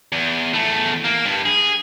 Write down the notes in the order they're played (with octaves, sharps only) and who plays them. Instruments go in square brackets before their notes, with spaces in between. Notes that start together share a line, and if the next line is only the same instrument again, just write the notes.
[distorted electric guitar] E2
E2 A3
A#3
G2
G#4